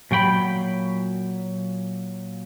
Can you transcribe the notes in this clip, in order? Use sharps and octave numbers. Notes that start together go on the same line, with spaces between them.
A#2 F#3 G5 B5